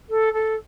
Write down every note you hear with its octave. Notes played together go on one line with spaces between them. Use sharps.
A4
A4